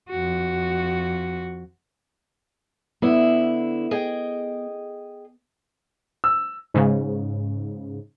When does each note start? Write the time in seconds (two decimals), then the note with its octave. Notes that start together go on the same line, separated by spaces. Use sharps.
0.10 F2 F#4
3.02 D3 B3 E4
3.91 G#4 D#5 G5
6.24 E6
6.74 G#2 C#3